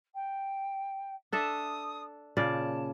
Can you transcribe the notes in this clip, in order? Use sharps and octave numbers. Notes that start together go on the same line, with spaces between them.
G5
D4 A4 E5 D#6
A#2 C#3 D5 A5